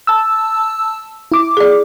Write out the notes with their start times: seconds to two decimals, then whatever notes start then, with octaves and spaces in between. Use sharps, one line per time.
0.07 A5 E6
1.32 E4 D6
1.57 G#4 D5